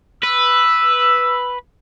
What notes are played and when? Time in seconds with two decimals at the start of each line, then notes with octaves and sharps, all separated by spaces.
0.24 B4 E6